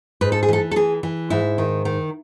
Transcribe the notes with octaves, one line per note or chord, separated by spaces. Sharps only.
G#2 B4
A4
G#4
E3 A4
A4
E3 G#4
E3
G#2 E4
D#3
D#3